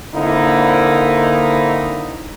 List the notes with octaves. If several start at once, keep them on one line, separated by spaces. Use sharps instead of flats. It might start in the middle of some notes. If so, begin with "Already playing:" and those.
D3 A#3 C4 D#4 E4